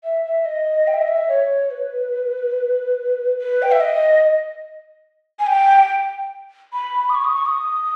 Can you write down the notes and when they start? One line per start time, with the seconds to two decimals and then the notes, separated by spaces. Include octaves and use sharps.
0.04 E5
0.25 E5
0.45 D#5
0.87 G5
0.94 E5
1.01 D#5
1.08 E5
1.29 C#5
1.71 B4
3.39 B4
3.62 G5
3.72 E5
3.81 D#5
5.39 G#5
5.47 G5
6.73 B5
7.10 D#6
7.15 C#6
7.24 D#6
7.35 C#6
7.46 D#6